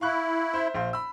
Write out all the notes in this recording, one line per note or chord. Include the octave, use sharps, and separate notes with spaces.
E4 F5 C#6 F#6
C5 E5
A#1 C5 F5
B5 E6